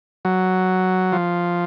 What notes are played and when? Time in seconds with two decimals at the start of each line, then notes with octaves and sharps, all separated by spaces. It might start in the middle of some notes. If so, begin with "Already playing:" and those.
0.25 F#3
1.12 F3